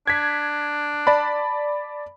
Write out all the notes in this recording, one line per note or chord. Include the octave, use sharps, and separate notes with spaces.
D4 G#6 B6
D5 A5 B5